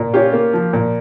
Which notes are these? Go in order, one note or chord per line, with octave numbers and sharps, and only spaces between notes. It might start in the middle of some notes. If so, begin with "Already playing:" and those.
Already playing: A#2
C#4 F4 G4
A#3
F3
A#2